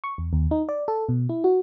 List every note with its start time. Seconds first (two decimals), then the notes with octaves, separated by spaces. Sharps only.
0.04 C#6
0.18 E2
0.33 D#2
0.51 D#4
0.69 D5
0.88 A4
1.09 B2
1.29 E4
1.44 F#4